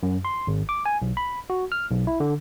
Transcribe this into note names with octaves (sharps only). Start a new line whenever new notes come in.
F#2
C6
G#1
D6
G#5
B1
B5
F#4
F6
B1
E4
D3